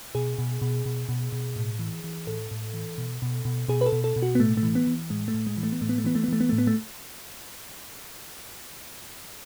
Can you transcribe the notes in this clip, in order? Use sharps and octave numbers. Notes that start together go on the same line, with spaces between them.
B2 G#4
B2
B2
B2
B2
B2
A2
E3
E3
A2 A4
A2
E3
B2
B2
B2
B2 G#4
B4
A4
B2
A4
B2
F#4
B3
A2 A3
A3
E3
B3
E3
A2 G#3
A3
A2
G#3
E3
A3
B3
A2 A3
B3
A3
E3 B3
A3
B3
E3 A3
B3
A2 A3
B3
A3